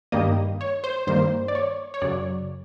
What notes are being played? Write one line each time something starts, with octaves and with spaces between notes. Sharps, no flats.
G2 D#3 G3 A#3 D#5
C#5
C5
G2 D#3 G3 A#3 C5
D5
C#5
C#5
F#2 C#3 F#3 D5